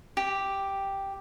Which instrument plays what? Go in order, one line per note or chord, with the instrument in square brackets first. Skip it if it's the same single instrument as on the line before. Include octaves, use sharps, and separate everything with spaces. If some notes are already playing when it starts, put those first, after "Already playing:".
[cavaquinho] G4